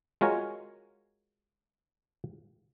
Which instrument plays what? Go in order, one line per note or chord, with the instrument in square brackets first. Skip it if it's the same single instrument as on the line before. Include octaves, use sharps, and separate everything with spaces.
[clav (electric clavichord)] G#3 F4 F#4 A#4 C#5 G#5